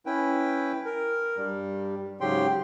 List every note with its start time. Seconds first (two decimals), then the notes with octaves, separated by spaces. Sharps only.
0.06 C#4 E4 B4 G5
0.85 A#4
1.37 G2 G3
2.21 G#2 C#3 F#3 G4 G5 C6